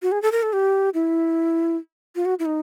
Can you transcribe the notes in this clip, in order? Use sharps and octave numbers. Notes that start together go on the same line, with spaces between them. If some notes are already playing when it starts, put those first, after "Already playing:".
F#4
G#4
A4
A#4
A4
G4
E4
F4
F#4
E4
D#4